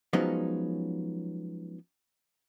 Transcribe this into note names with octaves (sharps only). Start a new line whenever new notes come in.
F3 F#3 G#3 B3 C#4 D#4